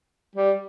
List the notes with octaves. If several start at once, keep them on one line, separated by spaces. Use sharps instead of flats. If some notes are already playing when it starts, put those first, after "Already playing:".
G3